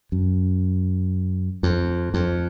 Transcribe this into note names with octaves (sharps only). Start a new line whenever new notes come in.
F#2
F2
F2